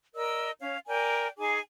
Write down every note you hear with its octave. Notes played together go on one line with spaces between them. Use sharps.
A#4 D5 D#5 E6
C#4 C#5 F5
A#4 D5 G5 G#5
D#4 G#4 G#5 D6